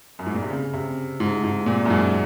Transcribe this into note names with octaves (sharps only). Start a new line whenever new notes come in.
F#2
G#2
A#2
C3
C#3
C3
G#2
G#2
A#2
F#2
G#2